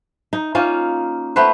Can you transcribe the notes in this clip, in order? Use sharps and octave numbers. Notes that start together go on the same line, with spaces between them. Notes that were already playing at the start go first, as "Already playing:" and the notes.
D#4
A#3 C#4 D#4 F4
A3 B3 B4 C5